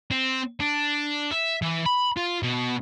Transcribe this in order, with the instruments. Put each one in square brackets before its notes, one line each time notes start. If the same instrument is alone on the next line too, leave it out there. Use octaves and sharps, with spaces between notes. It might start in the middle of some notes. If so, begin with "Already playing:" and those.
[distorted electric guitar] C4
D4
E5
E3
B5
F4
B2